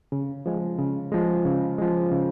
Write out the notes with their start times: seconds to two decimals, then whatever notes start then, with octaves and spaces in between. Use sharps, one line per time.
0.12 C#3
0.46 F3 G#3
0.79 C#3
1.12 F3 G#3
1.45 C#3
1.78 F3 G#3
2.12 C#3